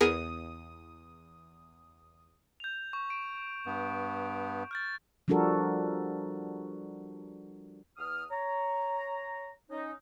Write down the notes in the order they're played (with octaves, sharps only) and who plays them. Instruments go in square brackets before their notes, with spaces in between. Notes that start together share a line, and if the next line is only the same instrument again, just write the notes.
[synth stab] E2 D#6 [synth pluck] B3 G#4 A#4
[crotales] G6 F7
C#6
D7
[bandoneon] G2 B3
[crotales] F6 G6 A6
[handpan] F3 G3 D4 F#4 A4 A#4
[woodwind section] E2 D#6 F6
C#5 A#5
C#4 D#4